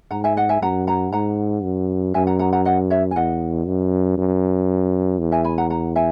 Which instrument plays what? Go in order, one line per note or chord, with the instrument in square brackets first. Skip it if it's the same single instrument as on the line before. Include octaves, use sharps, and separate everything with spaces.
[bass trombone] G#2 [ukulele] F#5 A#5
[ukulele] E5 G#5
D#5 F#5
E5 G#5
[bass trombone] F#2 [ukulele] F#5 A#5
[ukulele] F#5 A#5
[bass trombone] G#2 [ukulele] F#5 A#5
[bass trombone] F#2
[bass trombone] F#2 [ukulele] E5 G#5
[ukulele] F#5 A#5
F#5 A#5
F#5 A#5
D#5 F#5
C#5 E5
G#5
[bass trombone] E2 [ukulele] D#5 F#5
[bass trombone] F#2
F#2
E2
[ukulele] E5 G#5
G#5 B5
F#5 A#5
F#5 A#5
E5 G#5